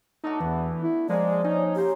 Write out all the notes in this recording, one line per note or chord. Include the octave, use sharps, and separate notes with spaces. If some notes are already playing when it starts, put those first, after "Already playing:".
A3 D4 D#4 F#4
E2 E3 B3
E4
F3 G#3 A#3 G#4 D5
C#4 D#4
C#3 D#4 G4 C5